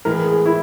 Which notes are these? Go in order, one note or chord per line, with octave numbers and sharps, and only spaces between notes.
A2 E3 G#3 A#4
G#4
E4